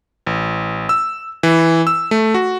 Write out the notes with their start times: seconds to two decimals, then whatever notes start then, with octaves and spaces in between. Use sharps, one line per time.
0.27 A1
0.89 E6
1.43 E3
1.87 E6
2.11 A3
2.34 F#4